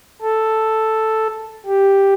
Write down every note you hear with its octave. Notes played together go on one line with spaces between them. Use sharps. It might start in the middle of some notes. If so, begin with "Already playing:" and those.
A4
G4